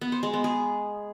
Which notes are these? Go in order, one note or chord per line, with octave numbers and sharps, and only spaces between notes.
B3
C5
G#3
B3
G#4